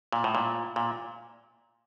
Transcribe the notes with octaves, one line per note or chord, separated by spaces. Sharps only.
A#2
A2
A#2
A#2